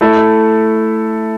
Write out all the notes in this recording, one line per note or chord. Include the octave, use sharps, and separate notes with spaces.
A3 E4 A4 E5